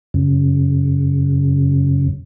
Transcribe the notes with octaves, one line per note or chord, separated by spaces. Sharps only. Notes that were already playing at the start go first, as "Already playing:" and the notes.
F#2 C#3